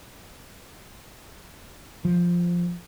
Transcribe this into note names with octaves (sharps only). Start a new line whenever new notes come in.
F3